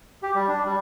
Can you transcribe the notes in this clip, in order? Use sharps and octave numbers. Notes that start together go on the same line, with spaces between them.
G4
G3
D4
G3